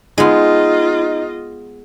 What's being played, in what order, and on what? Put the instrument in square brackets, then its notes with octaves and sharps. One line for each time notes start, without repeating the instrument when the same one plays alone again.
[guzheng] G#3 B3 [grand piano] D#4 [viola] F4 D#5